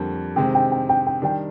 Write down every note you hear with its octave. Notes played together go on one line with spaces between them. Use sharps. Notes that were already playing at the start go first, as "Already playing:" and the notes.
Already playing: F2 D3 G3 A#3
C3 D#3 G#3 C4 G5
G5
G5
G5
G5
D#3 G3 D4 G5